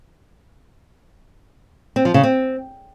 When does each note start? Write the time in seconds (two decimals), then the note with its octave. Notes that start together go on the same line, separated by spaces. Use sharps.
1.96 C4
2.05 F3
2.14 C#3
2.23 C4